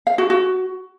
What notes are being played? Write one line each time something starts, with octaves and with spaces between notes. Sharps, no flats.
F5
F#4
F#4